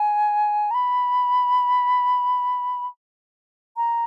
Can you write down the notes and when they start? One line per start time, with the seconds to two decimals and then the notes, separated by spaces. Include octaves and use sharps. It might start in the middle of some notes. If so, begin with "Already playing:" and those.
Already playing: G#5
0.71 A#5
0.74 B5
3.77 A#5